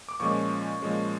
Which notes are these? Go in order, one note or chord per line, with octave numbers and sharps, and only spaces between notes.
D6
A#2 F3 G#3 C#4 C#6
A#2 F3 G#3 C#4